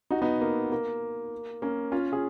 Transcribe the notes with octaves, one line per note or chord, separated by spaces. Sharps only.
D#4 F#4
B3 D#4
A#3
A#3
A#3 C#4
C#4 F4
F4 G#4